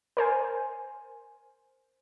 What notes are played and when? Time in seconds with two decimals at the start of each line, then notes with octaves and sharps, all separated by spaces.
0.17 A#4 C5 G#5